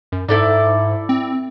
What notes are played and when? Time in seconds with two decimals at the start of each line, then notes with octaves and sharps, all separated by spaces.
0.12 F#2
0.28 G#2 E4 A4 D5
1.09 C4